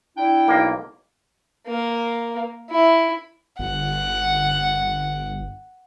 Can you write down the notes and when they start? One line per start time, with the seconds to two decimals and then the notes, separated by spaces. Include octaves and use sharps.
0.17 D4 E4 G5
0.48 B1 A#3
1.67 A#3
2.70 E4
3.59 G1 F#5